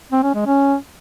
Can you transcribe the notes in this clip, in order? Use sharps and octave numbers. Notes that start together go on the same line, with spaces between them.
C4
C#4
G#3
C#4